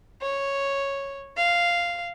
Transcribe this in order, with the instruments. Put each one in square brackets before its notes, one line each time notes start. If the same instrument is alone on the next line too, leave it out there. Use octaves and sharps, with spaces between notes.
[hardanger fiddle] C#5
F5